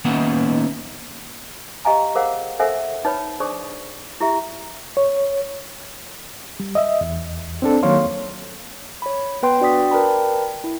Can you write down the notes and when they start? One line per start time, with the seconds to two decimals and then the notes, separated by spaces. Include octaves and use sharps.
0.05 D#3 A#3 B3 C#4 F#5
1.85 G4 D#5 F5 G#5 A#5
2.15 G#4 A#4 C5 F5 F#5
2.59 A4 A#4 C5 E5 F#5 G#5
3.05 D#4 B4 C#5 B5
3.40 D4 G#4 C5 D5 C#6 D#6
4.20 E4 G4 E5
4.97 C#5
6.60 G3
6.75 D#5 E5
7.01 E2
7.62 C4 D4 A4
7.83 D#3 F#3 A#3 C#5 F5 C6
9.02 C#5 B5
9.43 B3 B4 G5 C6
9.60 D4 F#4 D5 G5 D#6 B6
9.91 A#4 B4 D5 G5 A5 B5
10.64 E4